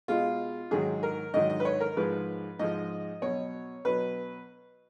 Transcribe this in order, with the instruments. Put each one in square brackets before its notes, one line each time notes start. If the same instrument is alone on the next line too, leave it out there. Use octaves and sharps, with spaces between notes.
[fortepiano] B2 G#3 F4
G#2 D#3 F#3 G#4
A#4
G#2 D#3 F#3 D#5
D#5
B4
C#5
A#4
G#2 F3 G#3 B4
G#2 F3 G#3 D#5
B2 F#3 C#5
B2 F#3 B4